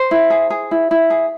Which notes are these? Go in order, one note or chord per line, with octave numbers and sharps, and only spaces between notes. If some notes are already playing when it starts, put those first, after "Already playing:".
Already playing: C5
E4
G#4
G#4
E4
E4
G#4